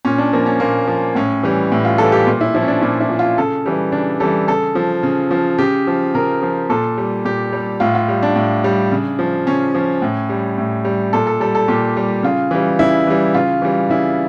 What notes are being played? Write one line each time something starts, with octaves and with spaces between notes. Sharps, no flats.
A#2 C#4
D4
F3 A#3
C#4
A#2 A#3
F3
A2 C#4
E3 G3
A2
F4
E3 G3 A4
G4
A#2
E4
F3 E4
C#4
D4
A#2 E4
E4
F3
F4
C#3 A4
E3 G3
C#3 D4
E3 G3 A4
C#3 A4
F3
C#3
F3
C#3 G4
F3
C#3 A#4
F3
A#2 A4
G3
A#2 G4
G3
A2 F4
F4
G3
D4
A2
G3
C#3
F3
C#3 C#4
F3
A2
G3
A2
G3
A#2 A4
A4
G3 A4
A4
A#2 G4
G3
C#3 F4
E3 G3
C#3 E4
E3 G3
C#3 F4
E3 G3
C#3 E4